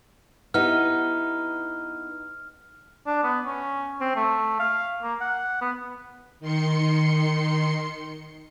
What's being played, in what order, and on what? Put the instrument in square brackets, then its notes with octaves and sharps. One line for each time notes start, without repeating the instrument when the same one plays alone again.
[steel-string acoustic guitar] B3 D#4 [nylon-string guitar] E4 G4 [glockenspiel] F6
[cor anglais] D4
B3
C#4
C4
A3
F5
A#3
F#5
B3
[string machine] D#3 C6 C#7